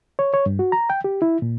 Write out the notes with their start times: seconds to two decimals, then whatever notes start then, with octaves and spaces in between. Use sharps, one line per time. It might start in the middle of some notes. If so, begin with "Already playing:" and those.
0.19 C#5
0.34 C#5
0.46 G2
0.59 F#4
0.72 A#5
0.90 G5
1.04 G4
1.22 E4
1.42 A#2